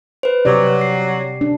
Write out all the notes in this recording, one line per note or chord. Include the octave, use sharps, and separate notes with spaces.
B4 C5
C3 F#3 G4 D5
C7
D4